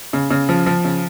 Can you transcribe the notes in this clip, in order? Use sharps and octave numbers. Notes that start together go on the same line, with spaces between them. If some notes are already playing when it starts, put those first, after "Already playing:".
C#3
C#3
F3
F3
C#3